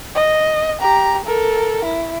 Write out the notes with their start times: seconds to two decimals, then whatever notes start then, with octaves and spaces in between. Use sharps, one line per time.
0.15 D#5
0.80 G4 A#5
1.25 A4 A#4
1.85 E4